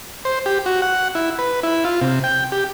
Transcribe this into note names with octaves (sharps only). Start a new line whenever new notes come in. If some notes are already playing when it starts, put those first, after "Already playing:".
C5
G4
F#4
F#5
E4
B4
E4
F4
C3
G5
G4